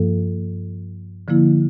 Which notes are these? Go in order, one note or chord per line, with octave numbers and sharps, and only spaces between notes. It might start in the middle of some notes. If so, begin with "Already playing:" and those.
Already playing: G2 F3 A#3 F4 A4
D3 F3 A#3 E4